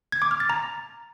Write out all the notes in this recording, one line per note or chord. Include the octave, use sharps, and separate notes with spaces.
G#6
D6
F6
A6
A#5